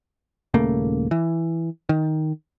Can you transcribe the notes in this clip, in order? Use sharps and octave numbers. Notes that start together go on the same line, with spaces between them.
D#1 C#3 A3 A#3
E3
D#3